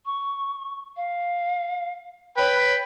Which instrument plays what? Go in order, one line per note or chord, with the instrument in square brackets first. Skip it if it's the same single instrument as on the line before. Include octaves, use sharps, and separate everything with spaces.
[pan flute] C#6
F5
[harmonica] B4 G5 B5 [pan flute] C#5